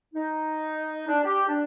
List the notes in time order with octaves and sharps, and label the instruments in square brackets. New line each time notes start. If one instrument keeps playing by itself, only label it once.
[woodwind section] D#4
D4
G4
D4